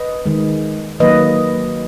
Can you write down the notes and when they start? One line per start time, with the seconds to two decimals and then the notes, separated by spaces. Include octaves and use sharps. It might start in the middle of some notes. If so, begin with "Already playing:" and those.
Already playing: B4 D#5
0.26 D#3 G#3
1.00 D#3 F#3 A#3 B4 D#5